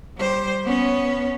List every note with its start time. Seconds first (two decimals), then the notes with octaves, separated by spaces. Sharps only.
0.17 G3 C5
0.64 B3 C#4